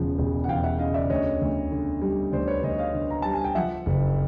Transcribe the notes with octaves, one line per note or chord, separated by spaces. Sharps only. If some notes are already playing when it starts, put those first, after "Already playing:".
Already playing: E1 E2 C#3 F3
E1
F#5
E2 F5 G5
E5 F#5
C#3 D#5 F5
D5 E5
D2 C#5 D#5
D2
D3
G3
D2 C5 D5
B4 C#5
D2 C#5 D#5
D#5 F5
D3
A#5
G3 A5
G#5
G5
F3 E5 F#5
F#1